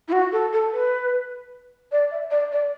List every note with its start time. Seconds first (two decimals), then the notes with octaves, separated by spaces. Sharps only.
0.08 E4
0.12 F#4
0.32 A4
0.53 A4
0.73 B4
1.92 D5
2.11 E5
2.31 D5
2.52 D5